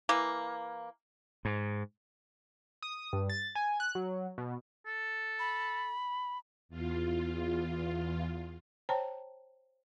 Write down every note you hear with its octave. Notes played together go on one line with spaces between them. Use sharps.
E3 A#3
G#2
D#6
G2
A6
G#5
F#6
F#3
B2
A4
B5
E2 F4
C5 C#5 G5 A5 A#5